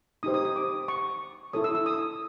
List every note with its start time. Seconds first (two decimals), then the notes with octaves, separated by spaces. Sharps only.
0.23 D#4 G4 C5 D#6
0.34 D#6
0.45 D#6
0.56 D6
0.88 C#6
1.53 E4 A4 C#5 D#6
1.64 E6
1.75 E6
1.86 D#6